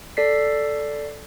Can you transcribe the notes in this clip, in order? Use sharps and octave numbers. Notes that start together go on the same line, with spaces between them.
A4 D5 B6 C7